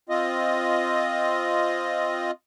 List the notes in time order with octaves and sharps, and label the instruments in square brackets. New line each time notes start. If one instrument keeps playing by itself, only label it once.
[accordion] C4 F4 D#5